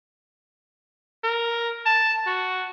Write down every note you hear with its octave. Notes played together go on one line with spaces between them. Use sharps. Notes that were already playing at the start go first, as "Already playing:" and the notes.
A#4
A5
F#4